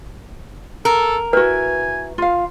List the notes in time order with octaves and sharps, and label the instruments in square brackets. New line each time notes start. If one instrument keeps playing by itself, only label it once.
[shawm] A4 [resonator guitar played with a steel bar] A#4
[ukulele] E4 F#4 [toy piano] B4 [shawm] G#5
[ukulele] F4 F5